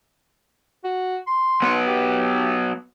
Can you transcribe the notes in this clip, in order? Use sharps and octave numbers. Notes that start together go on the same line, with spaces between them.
F#4
C6
F#3 B3 B4
G4